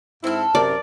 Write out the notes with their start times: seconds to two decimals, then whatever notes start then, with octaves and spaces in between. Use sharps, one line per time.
0.24 G#2 C4 E4 A4 F6
0.55 F#2 C3 A#4 D5